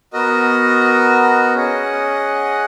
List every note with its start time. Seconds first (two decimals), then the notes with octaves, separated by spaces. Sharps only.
0.13 B3 F#4 A#4 D#5
1.54 C#4 G#4 D#5 F#5